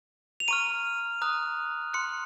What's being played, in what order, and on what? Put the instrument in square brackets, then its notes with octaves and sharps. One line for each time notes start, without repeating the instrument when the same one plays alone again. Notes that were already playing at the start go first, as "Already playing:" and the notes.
[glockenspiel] F7
A#5 C#6 F6 D#7
A#5 D#6 F#6
C6 F#6 C#7